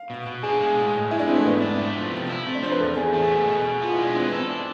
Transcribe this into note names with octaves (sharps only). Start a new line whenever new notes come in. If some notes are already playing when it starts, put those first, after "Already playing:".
Already playing: F5
B2
B2
D4 G#4
G#3
A2
A2
G#3 E4
D4
E3 C4
A3
G#2 B3
D4
A3
F3
C3
E4
A3 C4
D4
F3 C5
B4
E2 A4
E2 G#4
A3 G#4
B2
B2
B2
B3 F4
E4
G#3
D4
E3 C4
B3
C4 A4
D4